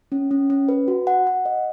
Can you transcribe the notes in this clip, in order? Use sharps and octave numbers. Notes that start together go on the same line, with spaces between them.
C#4
C#4
C#4
B4
F#4
F#5
F#5
D#5